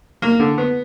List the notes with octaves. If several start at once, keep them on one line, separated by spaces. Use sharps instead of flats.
A#3
D3
B3